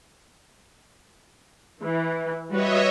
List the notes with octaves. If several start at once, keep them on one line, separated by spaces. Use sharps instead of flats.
E3
G3 F#4 B4 C#5 D#5 E5